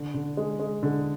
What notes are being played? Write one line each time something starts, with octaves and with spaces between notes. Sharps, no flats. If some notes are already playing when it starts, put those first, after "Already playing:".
Already playing: D3
D3
G#3
G#3
D3